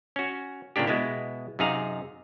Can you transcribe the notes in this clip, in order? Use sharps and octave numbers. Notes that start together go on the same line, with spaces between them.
C#4 F#4
A#2 C#3 A#3 D4 G4
B2 G#3 B3 E4
F#2 C3 D#4 G#4 F5 A#5